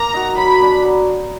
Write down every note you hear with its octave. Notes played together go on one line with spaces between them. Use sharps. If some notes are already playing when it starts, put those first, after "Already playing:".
Already playing: A#3 A#5
D#4 F#4
F#3 B5
B3 D4
F#3